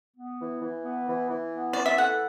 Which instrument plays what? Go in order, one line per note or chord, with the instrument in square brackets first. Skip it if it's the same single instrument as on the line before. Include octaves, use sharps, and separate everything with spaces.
[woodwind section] B3
E3
E3
B3
E3
E3
B3
[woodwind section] E3 [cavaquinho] D5
[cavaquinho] E5
[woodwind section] A4 [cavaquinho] F#5